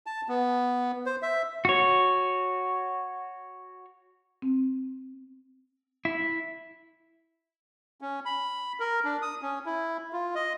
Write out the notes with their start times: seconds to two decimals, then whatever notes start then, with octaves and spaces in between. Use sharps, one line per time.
0.06 A5
0.28 B3
1.06 C5
1.22 E5
1.65 F#4 C#5
4.42 C4
6.05 E4
8.01 C#4
8.25 B5
8.80 A#4
9.05 D4
9.22 D#6
9.42 C#4
9.66 E4
10.13 F4
10.35 D#5